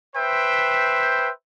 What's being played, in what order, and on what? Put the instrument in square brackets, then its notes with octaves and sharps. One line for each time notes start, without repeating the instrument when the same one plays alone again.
[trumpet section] B4 C5 E5 G5